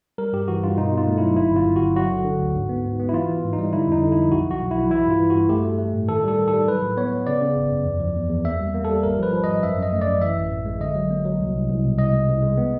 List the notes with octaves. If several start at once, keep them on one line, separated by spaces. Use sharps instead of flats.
G3 A#4
G2 G4
E3 F#4
G2 F4
B2 D#4
B2
F4
A3
F#3 E4
G1 E4
G1 F4
G1
G1 F#4
F#3 F#4
D3
D3
D2
G#2
B3
G#2
B3
E4
E3 F4
E3
G#2
D#4
G3
D3 E4
F2 D#4
D3
E4
F3
B1 F#4
B1 F#4
B1
B1 E4
E3 E4
G2 F4
E3
F#4
G2
A3 G4
A3
A3
A2
D#3 A4
G3 A4
D#3
A4
G3
F#3 B4
A2
B3 C#5
B3
C#3 D5
C#3
G#1
F#2
E2
F3
E2
E2
A#3 E5
G3
A#3
G3 A4
G#1 A#4
F3 B4
F3
G#1 D#5
F#2 E5
F#2 D#5
A3
D5
F#2
E3 E5
A1
A1
G#3
D3 D#5
F#3
A#3
F#3
C2
C2
C2
B2
C2 D#5
G#3
C2
G#3
B3